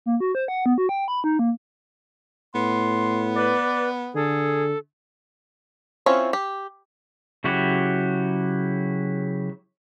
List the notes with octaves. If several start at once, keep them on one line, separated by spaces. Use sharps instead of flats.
A#3
F#4
C5
F#5
B3
F#4
G5
B5
D#4
A#3
A2 B3 C6
B4 D5
D3 G#4 A4
C4 C#4 E4 F4 C#5
G4
C#3 F#3 E4 F#4 G4